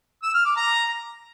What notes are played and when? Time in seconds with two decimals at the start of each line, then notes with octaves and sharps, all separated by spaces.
0.23 E6
0.34 F6
0.45 D6
0.57 A#5